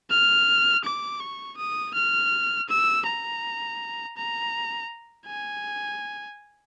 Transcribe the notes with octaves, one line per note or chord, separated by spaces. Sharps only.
F6
D6
C#6
D#6
F6
E6
A#5
A#5
G#5